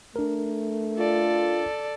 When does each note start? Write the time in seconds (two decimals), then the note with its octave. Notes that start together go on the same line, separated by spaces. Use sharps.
0.16 A3 D4 A#4
0.98 F4 A4 D5